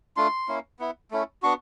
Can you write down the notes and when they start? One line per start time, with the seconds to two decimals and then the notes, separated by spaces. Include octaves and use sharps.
0.17 A3 D4 F4 C6
0.48 A#3 C#4 E4
0.79 B3 E4
1.11 A3 C#4 E4
1.42 B3 D4 F#4 C#6